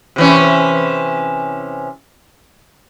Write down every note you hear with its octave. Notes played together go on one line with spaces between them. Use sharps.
C3 E3 C#4